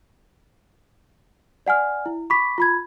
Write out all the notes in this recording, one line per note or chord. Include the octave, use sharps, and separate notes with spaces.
D5 F#5 G#5 F6
E4
B5 C#6 D6 B6
F4 B5 G#6